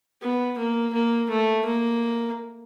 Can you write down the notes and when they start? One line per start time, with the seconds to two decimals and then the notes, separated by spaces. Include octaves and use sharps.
0.22 B3
0.58 A#3
0.93 A#3
1.30 A3
1.66 A#3